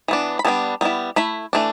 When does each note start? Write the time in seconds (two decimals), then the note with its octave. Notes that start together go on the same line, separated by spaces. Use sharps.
0.08 E3 B3 D4
0.39 B5
0.45 G3 B3 D4 A5
0.81 G3 B3 E4
1.16 A3 E4 B5
1.53 E3 A3 D4